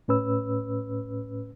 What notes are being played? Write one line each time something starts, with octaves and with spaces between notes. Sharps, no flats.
A2 C#4 B4 E6